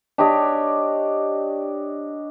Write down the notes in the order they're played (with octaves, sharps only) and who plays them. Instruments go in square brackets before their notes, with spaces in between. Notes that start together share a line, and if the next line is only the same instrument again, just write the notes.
[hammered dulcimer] D4 G4 C#5 D#5